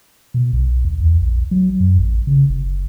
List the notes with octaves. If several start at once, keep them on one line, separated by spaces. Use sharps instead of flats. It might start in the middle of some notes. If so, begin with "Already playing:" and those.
B2
B1
D2
E2
A#1
F#3
F#2
A1
C#3
F#1